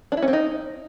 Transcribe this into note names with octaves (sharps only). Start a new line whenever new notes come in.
D4
E4
C#4
C4
D#4